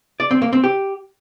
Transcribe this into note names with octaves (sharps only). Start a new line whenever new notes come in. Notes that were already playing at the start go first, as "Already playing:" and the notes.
D5
C4
A#3
C4
G4